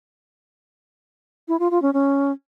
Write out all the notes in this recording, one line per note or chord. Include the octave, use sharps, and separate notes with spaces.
E4
F4
F4
C#4
C#4